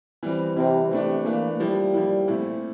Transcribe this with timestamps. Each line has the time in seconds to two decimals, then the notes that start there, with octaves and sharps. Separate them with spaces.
0.23 E3 G3 C4
0.56 C3 E3 G3 C4
0.91 C3 E3 A3 D4
1.25 E3 A3 A#3 D4
1.60 F3 G3 A#3 E4
1.94 F3 A#3 E4
2.28 A#2 A3 C4 E4